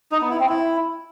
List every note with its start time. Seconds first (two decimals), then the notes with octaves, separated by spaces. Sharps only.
0.12 D#4
0.21 B3
0.30 E4
0.40 C4
0.49 E4